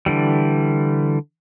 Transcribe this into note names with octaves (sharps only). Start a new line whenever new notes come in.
D3 E3 G3